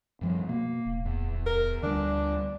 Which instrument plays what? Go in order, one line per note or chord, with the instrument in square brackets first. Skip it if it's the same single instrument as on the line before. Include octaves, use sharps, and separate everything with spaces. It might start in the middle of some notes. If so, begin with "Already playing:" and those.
[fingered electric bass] F#2 F3 G3
[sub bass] B2 [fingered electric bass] A#3
[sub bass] D1
[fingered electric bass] E2
[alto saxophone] A#4
[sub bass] D2 [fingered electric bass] D3 G3 [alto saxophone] D4